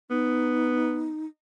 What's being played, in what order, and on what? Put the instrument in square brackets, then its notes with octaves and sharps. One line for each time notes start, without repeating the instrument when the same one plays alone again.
[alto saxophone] B3 [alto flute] D#4